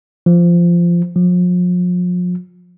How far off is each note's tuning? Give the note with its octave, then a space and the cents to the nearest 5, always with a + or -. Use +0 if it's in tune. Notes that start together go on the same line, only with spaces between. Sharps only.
F3 -15
F3 +40